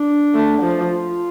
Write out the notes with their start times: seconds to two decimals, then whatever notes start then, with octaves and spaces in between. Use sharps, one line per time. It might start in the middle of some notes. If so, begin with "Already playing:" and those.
Already playing: D4
0.34 A3
0.62 F3
0.90 F4